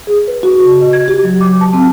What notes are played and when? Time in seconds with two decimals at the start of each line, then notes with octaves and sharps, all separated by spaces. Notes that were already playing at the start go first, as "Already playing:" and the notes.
0.07 G#4
0.28 B4
0.43 F#4
0.60 C#3
0.81 D#5
0.93 G#6
1.08 G4
1.24 F#3
1.41 D6
1.61 A5
1.73 C4